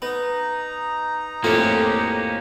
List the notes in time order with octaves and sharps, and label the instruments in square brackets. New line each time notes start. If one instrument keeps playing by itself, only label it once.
[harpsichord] B3 [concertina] D#4 A#5
[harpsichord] F2 A2 F4 [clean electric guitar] A#3 C#4 G4